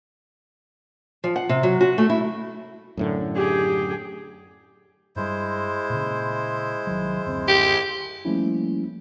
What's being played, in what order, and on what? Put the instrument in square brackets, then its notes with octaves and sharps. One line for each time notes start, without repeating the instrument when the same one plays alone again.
[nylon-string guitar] F3
F#5
C3
F#3
F#4
A3
E4
[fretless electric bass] F#2 A2 D3
[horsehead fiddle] G4 G#4
[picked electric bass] G2 G3 [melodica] G#3 E4 C5
[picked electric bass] A#2 C#3
C2 D#3 F#3
F#1 D2 C4
[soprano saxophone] G4
[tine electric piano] F3 G3 A3 A#3 C#4 E4